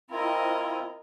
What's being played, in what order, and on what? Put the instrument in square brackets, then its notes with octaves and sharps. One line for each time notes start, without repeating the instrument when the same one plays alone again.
[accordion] C4 E4 F4 [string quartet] A#4 D#5